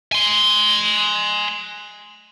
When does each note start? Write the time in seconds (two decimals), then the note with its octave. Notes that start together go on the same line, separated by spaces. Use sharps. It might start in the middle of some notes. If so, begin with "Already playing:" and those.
0.12 G#5 C6